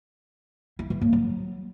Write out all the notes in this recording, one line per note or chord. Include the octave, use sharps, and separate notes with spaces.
E4
E3
A#3
F#3